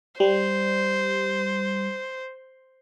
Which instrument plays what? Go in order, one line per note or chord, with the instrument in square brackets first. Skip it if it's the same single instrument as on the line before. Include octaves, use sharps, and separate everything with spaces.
[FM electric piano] G3 [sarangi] C5